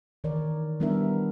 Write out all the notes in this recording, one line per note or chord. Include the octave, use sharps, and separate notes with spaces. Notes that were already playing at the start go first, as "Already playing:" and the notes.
D#3 E3 A#4 C#5 D5
G3 B3 D4 E4 A#4 E5